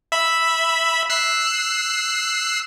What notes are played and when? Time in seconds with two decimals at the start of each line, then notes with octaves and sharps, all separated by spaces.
0.12 E5 B5
1.10 E6 F#6 C7